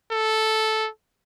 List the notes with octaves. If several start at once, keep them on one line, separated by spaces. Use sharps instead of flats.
A4